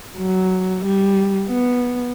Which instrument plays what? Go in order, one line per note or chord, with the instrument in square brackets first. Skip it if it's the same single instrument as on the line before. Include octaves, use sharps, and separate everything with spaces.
[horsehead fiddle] F#3
G3
B3